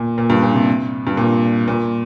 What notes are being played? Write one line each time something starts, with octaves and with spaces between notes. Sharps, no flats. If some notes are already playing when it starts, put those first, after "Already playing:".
Already playing: A#2
A#2
G2
A#2
C3
G2
A#2
A#2